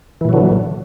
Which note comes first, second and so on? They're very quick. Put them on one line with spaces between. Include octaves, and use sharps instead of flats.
E3 A#2 F#3 D3